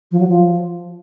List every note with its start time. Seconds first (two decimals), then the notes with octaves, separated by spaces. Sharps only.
0.11 F3
0.20 F#3
0.28 F3